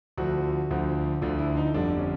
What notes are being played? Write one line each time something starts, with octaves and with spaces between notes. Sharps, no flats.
D2 D3 F3 F#4
D2 D3 F3
D2 D3 F3 F4
E4
D#4
G1 F2 D3 G3 D4
C#4